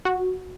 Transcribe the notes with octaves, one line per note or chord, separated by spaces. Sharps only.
F#4